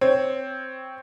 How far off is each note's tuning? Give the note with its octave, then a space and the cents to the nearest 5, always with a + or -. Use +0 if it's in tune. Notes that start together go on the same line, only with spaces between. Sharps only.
C4 +0 C#5 +0